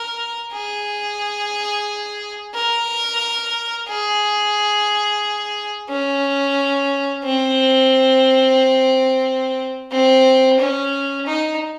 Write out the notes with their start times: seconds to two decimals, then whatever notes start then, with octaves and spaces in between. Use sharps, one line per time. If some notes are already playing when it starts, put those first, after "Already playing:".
Already playing: A#4
0.53 G#4
2.54 A#4
3.88 G#4
5.90 C#4
7.24 C4
9.91 C4
10.60 C#4
11.27 D#4